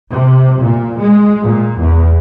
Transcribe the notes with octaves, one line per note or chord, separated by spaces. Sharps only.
C3
A#2
G#3
A#2
E2